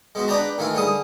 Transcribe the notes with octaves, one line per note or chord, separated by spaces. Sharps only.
G#3 B3 F#4
D4 B4 D5 G5 A5 A#5
D#3 E3 A3 F4
D3 G3 G#4 D#6